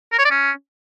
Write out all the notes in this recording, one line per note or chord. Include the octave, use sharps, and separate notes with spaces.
A#4
C#5
D5
C#4